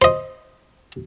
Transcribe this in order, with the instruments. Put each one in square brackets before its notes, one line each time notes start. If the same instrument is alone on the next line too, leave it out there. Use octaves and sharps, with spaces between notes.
[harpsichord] C5 D#5